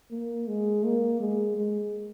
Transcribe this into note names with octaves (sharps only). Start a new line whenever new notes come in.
A#3
G#3
A#3
G#3
G#3